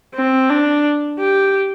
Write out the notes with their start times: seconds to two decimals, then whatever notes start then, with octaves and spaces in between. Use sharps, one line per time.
0.15 C4
0.50 D4
1.20 G4